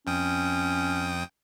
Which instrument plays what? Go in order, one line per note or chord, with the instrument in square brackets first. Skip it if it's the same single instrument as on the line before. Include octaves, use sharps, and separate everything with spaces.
[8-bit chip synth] F2 G5 D#6 [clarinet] C#4